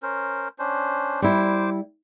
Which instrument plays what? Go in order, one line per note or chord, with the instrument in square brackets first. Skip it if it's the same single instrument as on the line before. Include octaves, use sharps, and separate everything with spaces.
[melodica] C#4 A#4 C5
C#4 D4 C5
[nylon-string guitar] G3 E4 [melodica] C5 D6